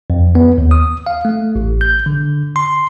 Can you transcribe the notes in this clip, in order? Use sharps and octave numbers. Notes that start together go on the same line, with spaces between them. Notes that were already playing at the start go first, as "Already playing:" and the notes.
F2
B3
D#2
D#6
F5
A3
A1
G6
D3
C6